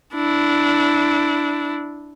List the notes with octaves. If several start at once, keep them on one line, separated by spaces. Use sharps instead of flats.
D4 E4